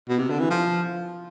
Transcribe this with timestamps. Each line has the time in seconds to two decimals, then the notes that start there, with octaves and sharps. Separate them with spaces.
0.09 B2
0.19 C3
0.29 D3
0.39 E3
0.50 F3